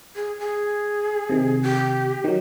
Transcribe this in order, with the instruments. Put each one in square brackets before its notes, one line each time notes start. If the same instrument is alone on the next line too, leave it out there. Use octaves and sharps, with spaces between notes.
[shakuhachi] G#4
G#4
[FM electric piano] C3 D#3
[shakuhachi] G4
[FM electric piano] D#3 F#3